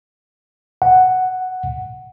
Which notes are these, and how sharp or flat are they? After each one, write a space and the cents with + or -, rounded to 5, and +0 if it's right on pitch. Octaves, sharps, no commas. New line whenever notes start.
F#5 +5